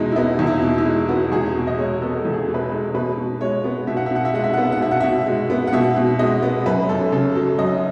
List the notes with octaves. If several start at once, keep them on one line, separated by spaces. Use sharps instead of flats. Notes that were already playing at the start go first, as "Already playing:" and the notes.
Already playing: E2 B2 G#3 D#4 E4
E4
B3 D#4
E2
E4
B2
E4
G#3
B3 F#4
E2 G#4
B2
D#5
G#3 C#5
B3 A4
E2 A4
G#4
B2
B4
A4
G#3
B2 B4
B2
G#3 C#5
B3
B2 E5
F#5
E5
B2 F#5
E5
G#3 F#5
E5
B3 F#5
E5
F#5
B2 E5
F#5
B2 E5
G#3
B3
F#5
B2 E5
B2
G#3 D#5
B3
F#2 B4
F#2 A4
C#3 A4
F#3 A4
F#2 D#5